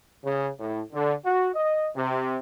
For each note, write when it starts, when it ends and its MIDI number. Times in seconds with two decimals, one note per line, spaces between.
0.24 0.49 49
0.59 0.81 45
0.93 1.13 50
1.24 1.48 66
1.54 1.90 75
1.95 2.37 48